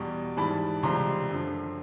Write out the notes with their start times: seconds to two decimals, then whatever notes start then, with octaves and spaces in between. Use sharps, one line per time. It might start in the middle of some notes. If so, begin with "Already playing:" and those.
Already playing: E2 B2 G3
0.37 G#2 E3 G3 A5 B5
0.83 C#2 C3 E3 G3 A#5 C6
1.30 F#2 D3 F3